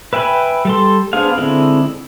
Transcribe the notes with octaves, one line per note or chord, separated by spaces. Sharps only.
B4 E5 G5 G#5 B5
G3 A4 C6
B3 D4 G#4 C5 F5
D3 G#3 C4 E4